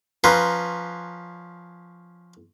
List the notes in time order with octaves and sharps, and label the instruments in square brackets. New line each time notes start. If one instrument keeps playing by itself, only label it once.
[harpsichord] F3 C#4 B4 A#5 C6